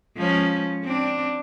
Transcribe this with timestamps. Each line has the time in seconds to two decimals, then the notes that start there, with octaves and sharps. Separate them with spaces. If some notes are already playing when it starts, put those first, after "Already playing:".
0.16 F3 G#3 C#4
0.83 C4 D4